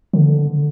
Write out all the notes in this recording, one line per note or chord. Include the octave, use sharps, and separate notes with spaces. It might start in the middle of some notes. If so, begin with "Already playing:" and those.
D3